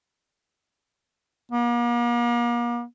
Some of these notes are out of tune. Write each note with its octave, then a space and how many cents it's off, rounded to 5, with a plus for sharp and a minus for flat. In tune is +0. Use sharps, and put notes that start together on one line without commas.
A#3 +40